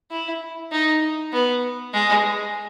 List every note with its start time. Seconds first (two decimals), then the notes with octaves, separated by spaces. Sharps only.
0.11 E4
0.72 D#4
1.33 B3
1.93 G#3